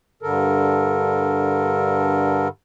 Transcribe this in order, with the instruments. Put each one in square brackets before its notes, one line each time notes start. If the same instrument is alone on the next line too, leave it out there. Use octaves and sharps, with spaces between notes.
[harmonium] G2 D3 A4 A#4